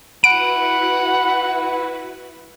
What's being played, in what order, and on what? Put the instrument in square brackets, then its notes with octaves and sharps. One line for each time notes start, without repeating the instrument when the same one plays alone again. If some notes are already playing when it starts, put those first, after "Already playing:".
[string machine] E4 F#4 B4 [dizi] F#5 [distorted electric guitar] B5 [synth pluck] D7